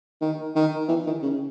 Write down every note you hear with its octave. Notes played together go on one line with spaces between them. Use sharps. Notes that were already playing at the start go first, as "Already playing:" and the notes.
D#3
D#3
E3
D#3
C#3